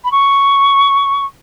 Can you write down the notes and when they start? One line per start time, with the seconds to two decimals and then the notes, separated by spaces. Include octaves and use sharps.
0.04 B5
0.12 C#6